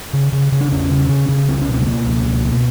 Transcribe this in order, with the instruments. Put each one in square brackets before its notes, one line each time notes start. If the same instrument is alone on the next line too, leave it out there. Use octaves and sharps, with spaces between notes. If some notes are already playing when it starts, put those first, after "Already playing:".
[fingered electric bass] C#3
C#3
C#3
D4
E2 C#4
C#3
C#3
C#3
C#2 C4
C#4
B2
C4
A3
B2 A#3
C#2
B2
B2